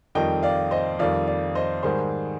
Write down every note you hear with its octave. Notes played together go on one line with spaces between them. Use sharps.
F2 D#3 G3 D#5 G5
D5 F5
C5 D#5
F2 D#3 G3 D5 F5
D5 F5
C5 D#5
G#2 D#3 G3 G#4 C5